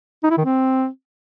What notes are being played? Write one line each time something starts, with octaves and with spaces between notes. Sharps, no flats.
D#4
E4
D#3
C4